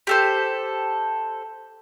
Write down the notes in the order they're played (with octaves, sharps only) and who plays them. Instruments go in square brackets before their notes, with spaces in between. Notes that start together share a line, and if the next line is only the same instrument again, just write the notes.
[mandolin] G4 A4 C5